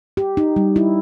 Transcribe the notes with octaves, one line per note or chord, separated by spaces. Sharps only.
G4
D#4
G3
E4